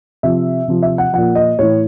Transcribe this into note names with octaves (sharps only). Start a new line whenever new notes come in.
C3 F3 E5
C3 F3
E5
F#5
A#2 F3 F#5
D#5
A2 E3 C#5